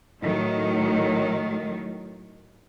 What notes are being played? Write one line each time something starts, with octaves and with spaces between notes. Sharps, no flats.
A2 D#3 F#3 A3